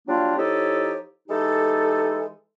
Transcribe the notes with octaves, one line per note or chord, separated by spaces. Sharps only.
F#3 G3 A#3 D4 F4
F3 D#4 E4 G4 A4 C#5
E3 G#3 D#4 G4 A4